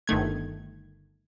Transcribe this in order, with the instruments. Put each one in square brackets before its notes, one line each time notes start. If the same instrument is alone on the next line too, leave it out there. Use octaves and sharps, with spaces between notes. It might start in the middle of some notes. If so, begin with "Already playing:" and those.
[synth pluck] G1 D#3 A3 G#6